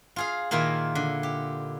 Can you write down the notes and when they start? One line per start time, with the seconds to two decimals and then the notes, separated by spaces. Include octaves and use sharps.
0.16 F4 G#4 F5
0.51 A#2 D#3 A#3 E4 F4
0.95 D3
1.23 G4